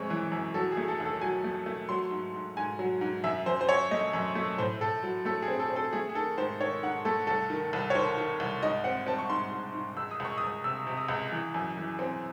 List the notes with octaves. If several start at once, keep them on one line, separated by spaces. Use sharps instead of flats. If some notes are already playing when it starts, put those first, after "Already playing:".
Already playing: F#2 G#3 C4 C#5
E3
F#2
F#3 A4
G#4
A3
A4
D#2
A4
F#3 G#5
A3
A3
F#3 C6
G#2
G#2
G#2 G#5
F#3
G#2
F#2 E5
F#2 C5
C5
F#2 C#5
A3 D#5
F#2
A3
A2 C5
A2 A4
F#3
A3 A4
G#4
C4
A4
C4
A4
A3 G#4
G#4
D#3 A4
G#2 C5
D#3 C#5
G#2 F#5
A3 A4
C2 A4
D#3
C2
C#5
D#3 C5
D#3
C2
G#2 D#5
C4 F#5
C4 A5
C#6
G#2 C6
G#2
G#2
C#2 E6
D#6
C#2 C#6
D#6
C#2
C3 E6
C3
D#6
C#2
E3
F#2
E3
C4